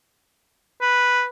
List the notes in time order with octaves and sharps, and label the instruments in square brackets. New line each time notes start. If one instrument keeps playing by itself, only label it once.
[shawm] B4